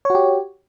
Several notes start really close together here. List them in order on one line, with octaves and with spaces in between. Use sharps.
C#5 F#4 G4